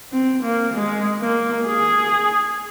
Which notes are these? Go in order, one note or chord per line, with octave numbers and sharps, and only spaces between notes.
C4
A#3
G#3
A#3
G#4